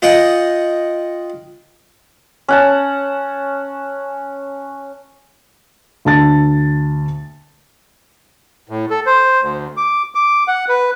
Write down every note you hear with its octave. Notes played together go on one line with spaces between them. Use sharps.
F4 D#5 F#5 G5
C#4 F#5 A5
D2 A5 A6
A2
A4
C5
D2
D6
D6
F#5
B4